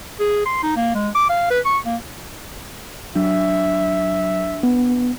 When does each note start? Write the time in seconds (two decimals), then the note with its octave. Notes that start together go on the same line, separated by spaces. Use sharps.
0.20 G#4
0.46 C6
0.63 D#4
0.77 A#3
0.95 G#3
1.15 D6
1.30 F5
1.50 B4
1.65 C#6
1.86 A#3
3.15 F#3 D4 E5
4.63 B3